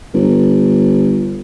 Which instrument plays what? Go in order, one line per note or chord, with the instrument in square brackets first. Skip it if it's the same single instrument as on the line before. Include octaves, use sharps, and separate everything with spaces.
[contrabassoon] G1